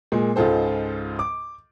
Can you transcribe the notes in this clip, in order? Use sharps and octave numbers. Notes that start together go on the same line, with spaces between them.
A#2 G#3
C#2 G#2 F4 A4 C5
D6